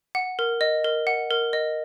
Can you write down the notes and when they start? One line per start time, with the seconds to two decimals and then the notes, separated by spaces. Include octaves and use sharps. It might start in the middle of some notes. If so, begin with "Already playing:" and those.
0.15 F#5
0.39 A#4
0.61 D#5
0.84 A#4
1.07 F#5
1.31 A#4
1.53 D#5